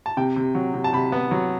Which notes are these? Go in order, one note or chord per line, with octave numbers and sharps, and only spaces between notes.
A5
C3 G5
C3
F#3
C3
A5
C3 B5
B3
F#3